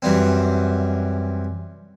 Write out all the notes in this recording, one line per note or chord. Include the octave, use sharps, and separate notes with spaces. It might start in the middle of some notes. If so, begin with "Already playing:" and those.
F#2 E3 G3 C4